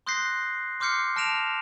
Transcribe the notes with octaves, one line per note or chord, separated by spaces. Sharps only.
C6 D#6 F#6 G6 A#6 C7
C6 D6 F6 G6 C7 C#7
A5 F6 A#6 D7 E7 F7